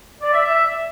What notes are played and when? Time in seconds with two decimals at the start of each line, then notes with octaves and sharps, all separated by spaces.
0.21 D5
0.33 E5
0.44 E5